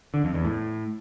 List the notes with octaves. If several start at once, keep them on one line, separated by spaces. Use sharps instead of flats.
D3
F2
E2
A2